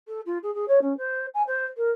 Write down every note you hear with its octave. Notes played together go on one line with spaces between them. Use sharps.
A4
F4
G#4
G#4
C#5
C#4
C5
G#5
C5
A#4